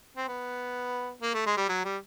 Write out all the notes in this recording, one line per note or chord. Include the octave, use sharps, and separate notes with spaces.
C4
B3
A#3
A3
G#3
G3
F#3
G3